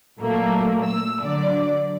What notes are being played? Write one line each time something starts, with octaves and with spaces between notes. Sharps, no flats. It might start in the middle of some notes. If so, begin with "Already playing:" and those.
A#2 F#3 A3 A#3
E6
D3 F#3 D5